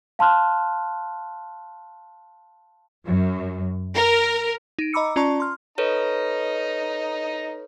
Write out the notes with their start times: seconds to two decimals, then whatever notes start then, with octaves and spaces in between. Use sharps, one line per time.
0.19 F5 A5 C6 F6 F#6
3.05 F#2
3.95 A#4
4.79 D#4 D7
4.93 D#5 A#5 B5 D6 E6 C#7
5.16 C#4 F4 D5 A5 A#5 C#6
5.40 C6 F6
5.78 D#4 A4 B4 C#5 A#5